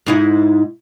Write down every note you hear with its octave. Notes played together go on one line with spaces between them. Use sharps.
G#2 D#4 E4